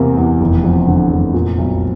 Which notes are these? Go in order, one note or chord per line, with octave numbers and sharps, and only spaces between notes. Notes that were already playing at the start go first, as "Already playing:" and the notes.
Already playing: E2 C3 A#3
E2
F1
F2
D3
F1
A#2
B1